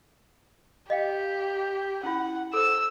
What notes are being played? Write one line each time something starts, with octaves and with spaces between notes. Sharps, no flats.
G4 D#5 F5 G5
C#4 E4 F4 F#5
A4 C5 E6